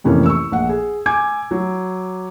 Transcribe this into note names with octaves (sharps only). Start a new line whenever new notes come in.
F2 A2 C3 E3 A#3 C#4
C#6 E6
A#1 F#5
G#4
G#5 D6 G6 G#6
F#3